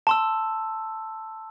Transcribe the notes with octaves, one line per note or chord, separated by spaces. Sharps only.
A5 C6 E6